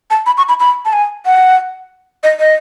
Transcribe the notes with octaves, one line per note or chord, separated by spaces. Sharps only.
A5
B5
C#6
B5
B5
A5
G#5
F#5
D#5
D#5